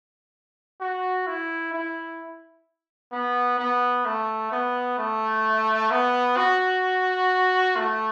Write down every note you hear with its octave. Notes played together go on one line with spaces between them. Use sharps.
F#4
E4
E4
B3
B3
A3
B3
A3
B3
F#4
A3